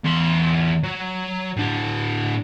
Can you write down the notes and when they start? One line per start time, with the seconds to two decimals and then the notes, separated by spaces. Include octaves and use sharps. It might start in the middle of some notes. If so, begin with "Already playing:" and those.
0.05 E2 C6
0.84 F#3
1.57 A2 D4